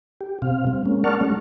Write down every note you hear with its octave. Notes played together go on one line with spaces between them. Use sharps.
G4
B2 C4 F5
G3 C4
G#3 A#3 C#4
A#4 D5 F#5 A5 C#6 F6
G3 A3 C#4